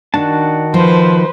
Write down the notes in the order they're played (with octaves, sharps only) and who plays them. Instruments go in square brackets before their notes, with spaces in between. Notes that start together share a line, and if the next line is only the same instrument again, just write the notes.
[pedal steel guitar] D#3 F#4 A5 [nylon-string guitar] D4
[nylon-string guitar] F3 [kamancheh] B4 C5